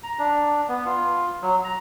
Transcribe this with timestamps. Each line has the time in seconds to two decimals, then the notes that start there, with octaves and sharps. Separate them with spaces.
0.03 A#5
0.19 D4
0.69 B3
0.86 F4
1.42 F#3
1.64 A#5